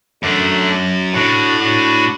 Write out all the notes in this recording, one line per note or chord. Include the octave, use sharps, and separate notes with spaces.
F#2 A3 D4
A2 D4 F#4
D4 F#4